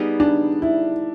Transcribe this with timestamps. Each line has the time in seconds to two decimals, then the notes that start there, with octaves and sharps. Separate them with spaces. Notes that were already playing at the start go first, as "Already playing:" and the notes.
Already playing: G3 B3 D#4 G#4
0.20 D4
0.62 E4